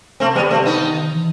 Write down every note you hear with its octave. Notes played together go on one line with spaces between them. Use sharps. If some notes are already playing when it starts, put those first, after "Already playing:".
C3 A3 C4
G3 B3
A3 C4
B3 D#4
D#3
D#3
E3